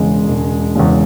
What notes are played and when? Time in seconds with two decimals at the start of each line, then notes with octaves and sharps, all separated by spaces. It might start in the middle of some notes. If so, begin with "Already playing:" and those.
Already playing: E1 E2 C#3 G#3
0.28 E1
0.75 E2 C#3 G#3